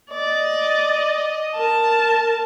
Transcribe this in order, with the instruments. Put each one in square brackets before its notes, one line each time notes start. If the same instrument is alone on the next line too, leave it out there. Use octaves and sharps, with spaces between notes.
[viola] D5 [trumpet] D#5
[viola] A#4 A5